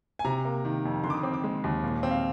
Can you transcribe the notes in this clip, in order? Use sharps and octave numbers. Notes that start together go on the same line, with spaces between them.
G#5
C3 A#5
A#3
D#3
F2
D3 C6
D6
D#6
C4 D6
D6
G#3
D#2
A#2
C4
F5